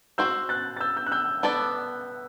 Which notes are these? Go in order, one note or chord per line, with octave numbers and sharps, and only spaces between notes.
C4 F#4 C5 E6 G6
F#6 A6
A6
E6 G6
E6 G6
F#6
E6 G6
B3 D4 A4 D5